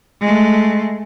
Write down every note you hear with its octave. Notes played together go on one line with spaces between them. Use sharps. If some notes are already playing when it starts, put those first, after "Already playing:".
G#3 A3